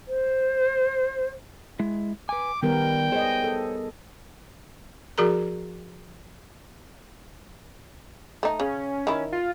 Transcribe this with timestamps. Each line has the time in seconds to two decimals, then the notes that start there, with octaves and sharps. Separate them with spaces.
0.07 C5
1.79 G#3 E4
2.29 B4 G#5 D6
2.63 D#3 G3 B3 A#4 G5
3.12 G#4 C5 C#5 D#5
3.44 A4
5.18 F3 F#4 G#4 A#4 A#5
8.43 A3 D#4
8.60 C#3 C#4
9.07 D#3 E4
9.32 F4